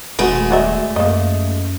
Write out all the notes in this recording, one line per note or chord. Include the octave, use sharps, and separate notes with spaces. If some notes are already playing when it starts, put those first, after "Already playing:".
D#1 G#3 A3 F#4 B4
F#4 D5 E5
F#2 A#3 D#5